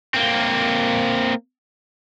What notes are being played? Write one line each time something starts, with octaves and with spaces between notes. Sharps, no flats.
A#3 C4